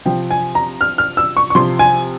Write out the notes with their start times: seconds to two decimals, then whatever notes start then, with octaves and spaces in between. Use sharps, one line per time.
0.05 C3 F3 G5
0.31 G#5
0.55 A#5
0.81 F6
0.98 F6
1.17 E6
1.37 C#6
1.50 C#6
1.55 C3 F3 C6
1.79 G#5